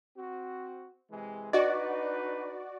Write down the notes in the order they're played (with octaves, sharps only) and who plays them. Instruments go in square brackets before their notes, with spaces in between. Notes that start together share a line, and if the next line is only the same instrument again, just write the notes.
[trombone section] C4 F#4
C3 E3 G#3
[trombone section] D4 D#4 B4 [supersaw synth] F#4 D5 [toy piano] D#5